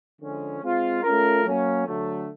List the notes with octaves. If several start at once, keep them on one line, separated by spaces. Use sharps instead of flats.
D3 F3 G#3 C#4
G#3 C4 F4
A3 C#4 F4 A#4
F#3 A#3 C#4
D3 F#3 A3